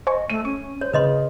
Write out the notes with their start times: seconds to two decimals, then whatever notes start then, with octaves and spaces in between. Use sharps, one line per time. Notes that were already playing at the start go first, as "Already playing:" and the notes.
0.07 C5 D#5 G#5 C#6
0.30 A3 D#7
0.45 C#4 C#6
0.81 C5 C#5
0.93 C#3 G#4 B4 D#5 C6